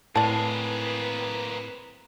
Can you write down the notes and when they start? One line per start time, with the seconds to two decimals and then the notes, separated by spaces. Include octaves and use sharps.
0.16 A2 A#3 C4 G#4 B4 D5 A5